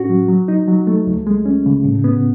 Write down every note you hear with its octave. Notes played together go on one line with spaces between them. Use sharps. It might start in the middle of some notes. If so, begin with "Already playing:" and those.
Already playing: A2 C#4 F#4
F#3
F#3
D#4
F#3
A3
C#2
G#3
C#4
C#3
A2
B3